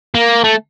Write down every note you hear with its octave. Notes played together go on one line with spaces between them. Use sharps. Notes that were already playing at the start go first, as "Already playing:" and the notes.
A#3
A3